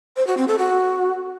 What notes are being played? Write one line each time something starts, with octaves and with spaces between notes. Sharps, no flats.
C5
F#4
C4
A4
F#4